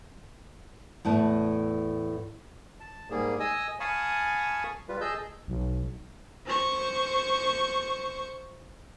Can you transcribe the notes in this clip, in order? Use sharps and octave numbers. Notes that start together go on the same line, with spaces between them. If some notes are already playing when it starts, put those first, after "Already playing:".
E2 A2 B4 A5
A5
G#2 G3 A#3 G#4
D#5 G#5 D#6 E6
F5 G#5 A5 B5 C#6 D#6
G3 F4 B4
G#4 D#5 A5 E6 G6
B1
C5 C#6